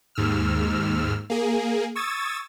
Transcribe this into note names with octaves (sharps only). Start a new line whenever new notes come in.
D#2 G#2 E6 F6
A#3 G#4
C#6 D#6 E6 G#6 A6